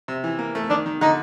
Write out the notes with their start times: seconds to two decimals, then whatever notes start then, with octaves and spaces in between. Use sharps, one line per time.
0.08 C3
0.24 E3
0.39 A#3
0.55 A3
0.70 D#3 D4
0.86 D#3
1.01 D3 D#4